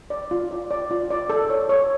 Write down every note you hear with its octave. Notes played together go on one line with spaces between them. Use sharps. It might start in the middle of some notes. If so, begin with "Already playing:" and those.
D5
F4
D5
D5
F4
D5
A4
C#5
C#5